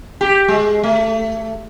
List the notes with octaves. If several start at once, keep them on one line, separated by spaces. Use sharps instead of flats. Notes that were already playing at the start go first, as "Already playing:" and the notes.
G4
G#3
A3